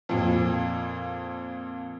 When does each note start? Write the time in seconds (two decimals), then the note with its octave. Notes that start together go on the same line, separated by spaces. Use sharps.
0.09 F2 A#2 F3